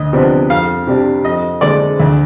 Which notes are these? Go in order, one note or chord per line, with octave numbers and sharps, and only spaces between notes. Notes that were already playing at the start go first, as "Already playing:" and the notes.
Already playing: D2 D#5
C3 F3 B3 D4
F2 F5
C3 G3 D4
F2 D#5
D3 G#3 D4 D5
D2